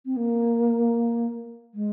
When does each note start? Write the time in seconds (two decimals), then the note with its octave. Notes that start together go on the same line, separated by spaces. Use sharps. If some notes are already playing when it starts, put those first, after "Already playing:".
0.06 C4
0.17 A#3
1.74 G#3